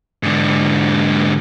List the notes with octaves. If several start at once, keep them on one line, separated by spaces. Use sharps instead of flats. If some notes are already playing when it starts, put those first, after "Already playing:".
G#2 D3